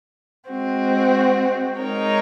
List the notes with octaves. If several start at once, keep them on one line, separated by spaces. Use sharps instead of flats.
G#3 C4 F#4
G#3 D#4 A#4 C#5